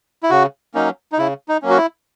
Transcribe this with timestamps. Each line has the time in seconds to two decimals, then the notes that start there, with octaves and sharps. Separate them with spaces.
0.23 E4
0.30 C#3 F#4
0.74 F#3 A#3 C#4 D#4
1.12 D#4
1.18 C#3 E4
1.49 D#4
1.63 F#3 A#3 C#4
1.70 F#4
1.77 E4